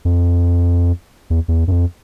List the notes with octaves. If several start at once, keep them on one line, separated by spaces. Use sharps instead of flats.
F2
E2
E2
F#2
F2